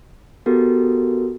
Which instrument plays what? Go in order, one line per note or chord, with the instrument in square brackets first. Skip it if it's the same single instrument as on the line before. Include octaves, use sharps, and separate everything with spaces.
[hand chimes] B3 F#4 G4 A4 A#4